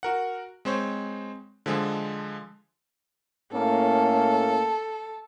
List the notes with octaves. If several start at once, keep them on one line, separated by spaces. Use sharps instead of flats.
F#4 A#4 F#5
G#3 C4 C5 C#5
D3 F3 G#3 G#4 A4
A2 A#3 C#4 A4